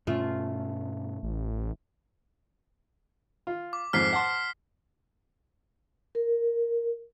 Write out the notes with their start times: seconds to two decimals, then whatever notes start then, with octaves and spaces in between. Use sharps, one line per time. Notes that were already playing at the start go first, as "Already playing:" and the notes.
0.07 G2 B2 A3 C#4 F4
1.23 A1
3.47 F4
3.73 D6
3.93 F2 G#2 F3 F6 B6 C7
4.13 F#5 A5 C6
6.15 A#4